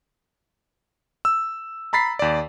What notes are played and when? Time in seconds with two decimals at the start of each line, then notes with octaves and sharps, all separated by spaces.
1.25 E6
1.93 A#5 B5 A6 B6 C7
2.19 D#2 D5